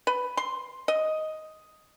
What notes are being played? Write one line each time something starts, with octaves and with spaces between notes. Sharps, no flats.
B4
C6
D#5